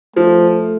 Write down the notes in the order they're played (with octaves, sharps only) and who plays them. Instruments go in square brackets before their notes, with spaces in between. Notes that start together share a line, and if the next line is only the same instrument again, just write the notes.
[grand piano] F3 [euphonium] A3